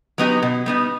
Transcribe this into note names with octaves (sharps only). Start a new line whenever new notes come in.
F#3 B3 D#4 G4
B2
G3 B3 D#4